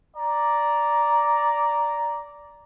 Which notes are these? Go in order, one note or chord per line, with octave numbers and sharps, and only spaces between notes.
D5 A#5